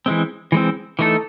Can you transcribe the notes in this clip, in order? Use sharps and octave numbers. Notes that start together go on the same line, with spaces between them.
E3 G#3 C4
E3 G#3 C4
E3 A3 D#4 A4